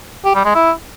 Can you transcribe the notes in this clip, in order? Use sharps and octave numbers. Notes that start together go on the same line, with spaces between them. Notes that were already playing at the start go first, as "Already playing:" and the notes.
G4
G3
G#3
E4